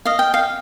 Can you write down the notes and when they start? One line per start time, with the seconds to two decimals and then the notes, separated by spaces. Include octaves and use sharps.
0.05 D#5 F5
0.19 G5
0.34 F5